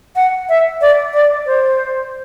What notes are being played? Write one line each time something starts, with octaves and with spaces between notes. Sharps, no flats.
F#5
E5
D5
D5
C5